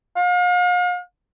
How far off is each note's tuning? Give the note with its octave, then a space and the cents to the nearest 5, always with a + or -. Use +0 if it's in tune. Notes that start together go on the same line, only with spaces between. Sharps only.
F5 +40